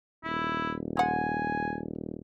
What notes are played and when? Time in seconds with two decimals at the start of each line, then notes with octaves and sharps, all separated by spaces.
0.24 D#1 E4
0.97 G#3 F#5 G#5